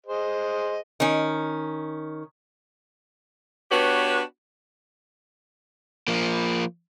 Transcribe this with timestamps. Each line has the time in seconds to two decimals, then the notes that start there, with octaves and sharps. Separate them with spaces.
0.06 G#4 C5 D#5
1.00 D#3 C#4
3.71 B3 D4 F#4 G4 B4 C#5
6.08 F3 A#3